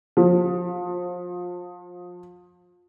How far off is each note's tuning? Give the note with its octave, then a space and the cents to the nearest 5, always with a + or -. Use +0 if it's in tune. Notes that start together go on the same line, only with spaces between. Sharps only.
F3 +35